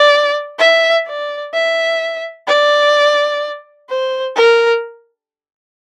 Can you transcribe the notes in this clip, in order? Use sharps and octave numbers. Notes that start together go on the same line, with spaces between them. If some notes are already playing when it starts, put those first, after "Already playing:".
Already playing: D5
E5
D5
E5
D5
C5
A#4